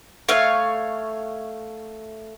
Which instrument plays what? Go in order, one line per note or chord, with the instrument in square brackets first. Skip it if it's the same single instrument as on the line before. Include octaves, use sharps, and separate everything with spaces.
[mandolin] A3 C#5 F5